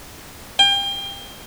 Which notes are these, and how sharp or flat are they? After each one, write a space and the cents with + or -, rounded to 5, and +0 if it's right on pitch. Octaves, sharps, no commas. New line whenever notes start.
G5 +30